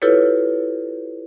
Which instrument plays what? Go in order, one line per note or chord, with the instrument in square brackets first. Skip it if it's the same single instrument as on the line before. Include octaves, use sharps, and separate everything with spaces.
[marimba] E4 F4 G4 A4 B4 C#5